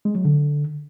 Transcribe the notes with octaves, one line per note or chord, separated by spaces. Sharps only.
G#3
F#3
D3